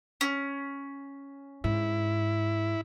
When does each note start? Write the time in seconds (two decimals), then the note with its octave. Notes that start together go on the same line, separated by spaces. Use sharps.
0.21 C#4
1.64 G#2 E4